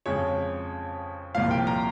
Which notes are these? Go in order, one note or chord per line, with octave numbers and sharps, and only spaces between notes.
F2 C#3 G#3 C#5
C2 A#2 F3 F5
G5
A#5